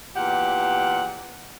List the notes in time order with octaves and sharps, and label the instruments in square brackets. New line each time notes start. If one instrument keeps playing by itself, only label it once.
[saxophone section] E2 A#2 G4 F#5